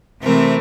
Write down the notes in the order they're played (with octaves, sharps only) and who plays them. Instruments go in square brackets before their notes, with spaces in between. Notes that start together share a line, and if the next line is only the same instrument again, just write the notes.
[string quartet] C3 E3 A3 C4 A#4